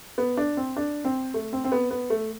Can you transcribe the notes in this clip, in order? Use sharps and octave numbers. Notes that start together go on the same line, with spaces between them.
B3
D4
C4
D4
C4
A3
C4
C4
B3
B3
A3